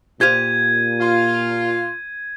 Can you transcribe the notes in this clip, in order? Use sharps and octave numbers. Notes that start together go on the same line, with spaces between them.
A#2 G4 C5 F5 G#6 D#7
F4